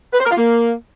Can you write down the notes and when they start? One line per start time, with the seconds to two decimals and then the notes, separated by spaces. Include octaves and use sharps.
0.13 B4
0.19 C5
0.25 A#4
0.31 F4
0.37 A#3